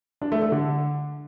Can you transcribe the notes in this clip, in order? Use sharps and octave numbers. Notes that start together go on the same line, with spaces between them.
D4
A3
A3
D3